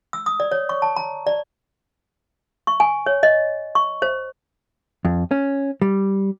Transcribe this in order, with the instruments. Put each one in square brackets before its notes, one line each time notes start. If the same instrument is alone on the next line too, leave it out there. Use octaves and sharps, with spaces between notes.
[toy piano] E6
D#6
D5
C#5
C#6
A5
A#5
D5
C#6
G#5
C#5
D#5
C#6
C5
[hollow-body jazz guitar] F2
C#4
G3